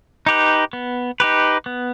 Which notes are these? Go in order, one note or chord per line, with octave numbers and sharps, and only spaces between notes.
D#4 G4 B4
B3
D#4 G4 B4
B3